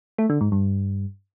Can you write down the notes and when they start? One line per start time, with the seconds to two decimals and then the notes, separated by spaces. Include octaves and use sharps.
0.18 A3
0.30 D3
0.41 G#2
0.52 G2